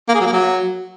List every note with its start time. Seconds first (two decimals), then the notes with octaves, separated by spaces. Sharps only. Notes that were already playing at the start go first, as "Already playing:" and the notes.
0.09 A#3
0.15 G#4
0.21 F#3
0.27 A#3
0.33 F#3